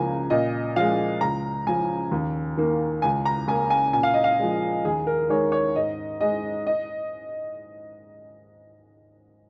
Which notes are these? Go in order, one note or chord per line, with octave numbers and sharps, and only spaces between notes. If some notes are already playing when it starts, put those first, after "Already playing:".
Already playing: C#2 C#3 F3 A#3 G#5 A#5
A#2 D#5
F3 G#3 F5
C#2 A#5
C#3 F3 G#5
D#2
D#3 A#3
C#2 G#5
A#5
C#3 A#3 G#5
G#5
A#2 G#5
F5
D#5
F5
F3 G#3
D#2 G#4
A#4
D#3 G#3 C#5
C#5
G#2 D#5
G#3 D#5
D#5